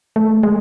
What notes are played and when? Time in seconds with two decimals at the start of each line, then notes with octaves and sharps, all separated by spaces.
0.16 A3
0.43 G#3